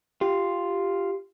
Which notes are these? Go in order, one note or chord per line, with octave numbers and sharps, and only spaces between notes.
F4 G4